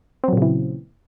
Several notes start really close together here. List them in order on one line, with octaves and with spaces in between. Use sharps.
C4 F#3 A#2 C#3 E3